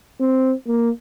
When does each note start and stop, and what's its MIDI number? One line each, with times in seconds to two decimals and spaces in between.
0.20 0.54 60
0.68 0.90 58